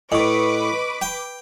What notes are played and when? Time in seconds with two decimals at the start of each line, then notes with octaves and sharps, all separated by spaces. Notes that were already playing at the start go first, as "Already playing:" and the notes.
0.12 A2 B4 D#5 C#6 D6
1.01 G5